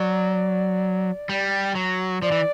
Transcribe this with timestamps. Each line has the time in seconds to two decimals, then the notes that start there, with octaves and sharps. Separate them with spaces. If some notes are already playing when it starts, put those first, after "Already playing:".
Already playing: F#3 D5
1.29 G3
1.75 F#3
2.22 F3 D5
2.32 E3